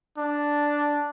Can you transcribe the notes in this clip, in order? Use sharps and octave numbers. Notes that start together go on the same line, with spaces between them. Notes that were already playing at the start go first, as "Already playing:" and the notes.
D4